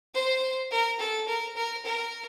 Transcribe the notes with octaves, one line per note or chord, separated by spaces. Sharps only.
C5
A#4
A4
A#4
A#4
A#4